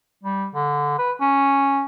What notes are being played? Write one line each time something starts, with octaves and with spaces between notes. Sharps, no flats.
G3
D3
B4
C#4